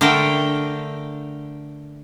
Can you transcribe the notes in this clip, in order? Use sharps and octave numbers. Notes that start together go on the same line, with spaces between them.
D3 A3 A#4 G5